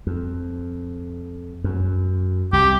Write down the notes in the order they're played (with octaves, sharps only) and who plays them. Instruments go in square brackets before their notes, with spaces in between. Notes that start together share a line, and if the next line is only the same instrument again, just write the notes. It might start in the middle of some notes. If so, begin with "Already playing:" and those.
[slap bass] F2
F#2
[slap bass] C2 [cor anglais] G4